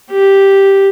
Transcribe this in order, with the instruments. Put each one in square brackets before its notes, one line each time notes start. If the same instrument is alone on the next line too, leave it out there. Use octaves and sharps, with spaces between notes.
[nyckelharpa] G4